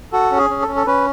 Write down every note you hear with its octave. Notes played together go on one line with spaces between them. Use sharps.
F#4 A4
C#4
G#4
C#4
A4
C#4
A4
C#4 B4